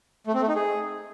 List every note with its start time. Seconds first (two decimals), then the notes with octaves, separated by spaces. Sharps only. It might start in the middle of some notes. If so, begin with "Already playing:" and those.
0.27 A3
0.34 C4
0.41 A3
0.48 D#4
0.55 G#4